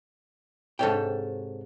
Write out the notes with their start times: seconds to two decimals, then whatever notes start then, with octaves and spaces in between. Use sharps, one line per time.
0.79 G#2 C3 A4 C#5 G5